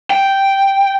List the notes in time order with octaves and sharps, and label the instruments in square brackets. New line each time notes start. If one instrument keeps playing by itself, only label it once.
[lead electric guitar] G5